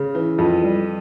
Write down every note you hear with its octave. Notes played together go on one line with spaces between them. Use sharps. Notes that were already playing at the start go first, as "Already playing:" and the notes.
Already playing: C#3
E3
F2
G3